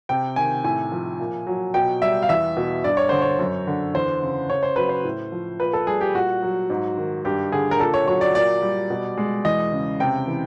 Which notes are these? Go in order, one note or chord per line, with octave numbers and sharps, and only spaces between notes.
C3 G5
D#3 G#5
A2 G#5
F3
A#2
F#3
B2 G5
G3 E5
F5
E2 E5
B2
G2 D5
C#5
D3 C5
C#5
F#2
D3
E2 C5
C#3
C#3 C#5
C5
F#3 B4
C5
A2
F3
A#2 B4
A4
G3 G#4
G4
A#2 F#4
F#3
G#2
D#3
G2 G4
D3 G#4
A#4
A#2 A4
C#5
F#3 C#5
D5
A#2 D5
G3
B2
G#3
E2 D#5
C#3
C3 G5
E3